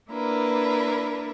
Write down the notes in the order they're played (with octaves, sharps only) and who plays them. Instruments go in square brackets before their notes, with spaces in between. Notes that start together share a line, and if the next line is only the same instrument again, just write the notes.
[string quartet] A#3 D4 E4 A#4 B4